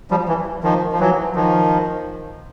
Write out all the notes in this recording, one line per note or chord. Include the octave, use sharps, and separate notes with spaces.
F3 G3
E3
D#3 F3
F3
E3 F#3
D#3 F3